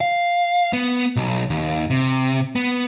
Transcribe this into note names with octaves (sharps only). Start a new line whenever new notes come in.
F5
B3
B1
D#2
C3
B3